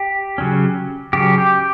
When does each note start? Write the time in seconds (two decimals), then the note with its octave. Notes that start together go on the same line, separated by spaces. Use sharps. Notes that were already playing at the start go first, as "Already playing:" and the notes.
Already playing: G4
0.38 C#3 F#3 C#4
1.13 C#3 F#3 C#4 G4
1.38 G4